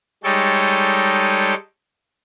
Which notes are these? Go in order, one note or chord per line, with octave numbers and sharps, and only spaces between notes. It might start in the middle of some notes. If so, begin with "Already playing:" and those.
G3 G#3 D#4 A4 C#5 G5